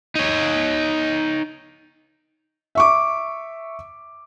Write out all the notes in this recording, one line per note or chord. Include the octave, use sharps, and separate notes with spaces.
D#4 C#5
E5 C#6 D6